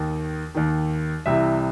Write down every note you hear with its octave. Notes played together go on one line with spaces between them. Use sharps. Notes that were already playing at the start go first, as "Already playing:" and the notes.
Already playing: D#2 D#3
D#2 D#3
C2 C3 E3 E5